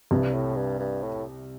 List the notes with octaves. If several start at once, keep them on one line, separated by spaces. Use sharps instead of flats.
C2 G2 C3
A2
G2
G2
A2